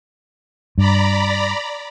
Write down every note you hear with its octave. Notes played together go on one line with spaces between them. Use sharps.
G2 D5 A#5 B5